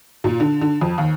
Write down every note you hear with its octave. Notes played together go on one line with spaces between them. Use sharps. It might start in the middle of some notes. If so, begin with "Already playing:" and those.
A#2
D3
D3
F2
D#2